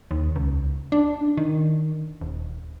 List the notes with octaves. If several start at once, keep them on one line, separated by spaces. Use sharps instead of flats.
D#2
C#2
D4
D#3
D#1